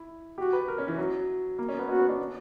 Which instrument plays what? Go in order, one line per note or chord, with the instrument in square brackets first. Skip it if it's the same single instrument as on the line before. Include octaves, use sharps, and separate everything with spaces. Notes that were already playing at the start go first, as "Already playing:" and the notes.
Already playing: [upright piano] E4
[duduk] F#4 [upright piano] G4
[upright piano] B4
A#4
C#4
E3
F#3
A#3
C#4
B3
[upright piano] C#4 [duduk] F#4
[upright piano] B3
D4
C#4